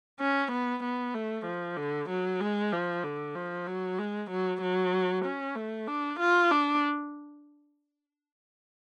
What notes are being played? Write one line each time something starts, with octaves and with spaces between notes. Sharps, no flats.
C#4
B3
B3
A3
F3
D3
F#3
G#3
F3
D3
F3
F#3
G#3
F#3
F#3
C#4
A3
D4
F4
D4